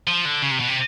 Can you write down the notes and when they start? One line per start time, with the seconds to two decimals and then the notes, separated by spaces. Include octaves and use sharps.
0.07 F3
0.25 D3
0.42 C#3
0.51 C3
0.60 B2
0.69 C3